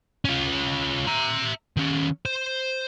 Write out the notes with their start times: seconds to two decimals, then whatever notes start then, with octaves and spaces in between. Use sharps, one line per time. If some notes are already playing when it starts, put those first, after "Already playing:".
0.25 C#4 F4
1.07 E5 A#5
1.77 D#3 C#4
2.26 C5